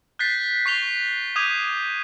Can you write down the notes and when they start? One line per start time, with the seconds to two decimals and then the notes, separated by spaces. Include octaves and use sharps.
0.19 F#6 G6 A6 B6 C7
0.66 C#6 C7 F7 G7
1.36 D6 D#6 G6 G#6 D#7 F7